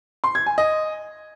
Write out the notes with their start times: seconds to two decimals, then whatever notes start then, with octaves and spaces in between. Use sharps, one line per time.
0.24 C6
0.35 G#6
0.46 G#5
0.58 D#5